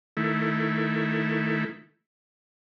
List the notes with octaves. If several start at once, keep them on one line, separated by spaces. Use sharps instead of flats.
D#3 A3 E4